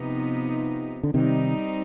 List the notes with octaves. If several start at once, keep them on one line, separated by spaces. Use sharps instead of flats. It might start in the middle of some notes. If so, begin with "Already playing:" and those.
Already playing: C3 F3 B3 D#4
D3
C3 D#3 G3 C4 D#4